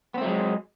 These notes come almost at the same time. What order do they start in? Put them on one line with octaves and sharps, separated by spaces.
B3 C4 A3 F#3 G#3